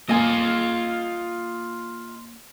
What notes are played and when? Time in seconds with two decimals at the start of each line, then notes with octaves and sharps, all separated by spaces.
0.09 A#3 F4 D#5 G#5